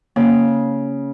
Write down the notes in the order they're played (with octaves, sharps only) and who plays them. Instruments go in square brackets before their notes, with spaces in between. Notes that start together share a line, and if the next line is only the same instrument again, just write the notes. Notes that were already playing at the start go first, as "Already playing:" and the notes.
[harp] C#3 [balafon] A#3